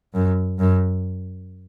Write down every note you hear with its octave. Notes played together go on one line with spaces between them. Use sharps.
F#2
F#2